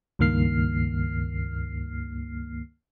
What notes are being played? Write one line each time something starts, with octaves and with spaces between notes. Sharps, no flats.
C#2 G2 D#3 A#3 F6 C7